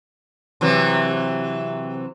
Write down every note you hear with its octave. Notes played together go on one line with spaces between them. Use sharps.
C3 E3 F#3